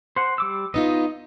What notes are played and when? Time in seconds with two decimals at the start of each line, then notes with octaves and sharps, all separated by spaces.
0.16 C5 F#5
0.38 G3 D6 E6
0.74 B3 D#4 F4 D#5